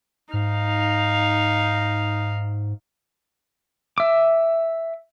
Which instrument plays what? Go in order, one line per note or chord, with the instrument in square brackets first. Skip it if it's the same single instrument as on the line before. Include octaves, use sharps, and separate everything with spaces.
[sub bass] G#2 [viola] D#4 F5
[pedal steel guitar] E5 D6